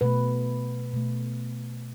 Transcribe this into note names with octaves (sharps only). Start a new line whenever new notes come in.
B2 A3 B4
B2 A3